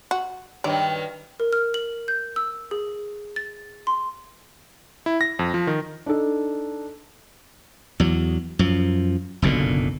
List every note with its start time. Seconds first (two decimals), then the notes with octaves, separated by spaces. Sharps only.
0.11 F#4
0.64 G2 D#3 F#3 D5
1.40 A#4
1.53 F6
1.74 F#7
2.08 G6
2.36 E6
2.71 G#4
3.36 A6
3.87 C6
5.06 E4
5.21 A#6
5.39 F2
5.54 F3
5.67 D#3
6.06 D4 D#4 A4
8.00 E2 F#3
8.59 F#2 F3
9.42 F#1 B1 A#2 D3